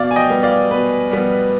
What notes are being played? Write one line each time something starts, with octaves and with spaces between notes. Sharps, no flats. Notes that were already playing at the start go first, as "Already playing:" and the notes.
Already playing: B2 D5 F5
G#5
D#5 G5
G3 B3
D5 F5
B2 B4
G3 B3